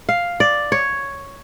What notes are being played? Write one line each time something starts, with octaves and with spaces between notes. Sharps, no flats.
F5
D5
C#5